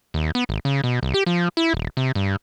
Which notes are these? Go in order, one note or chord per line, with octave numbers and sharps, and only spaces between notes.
D#2
B3
G#1
C#3
B2
C2
G4
F3
E4
D#1
C3
G2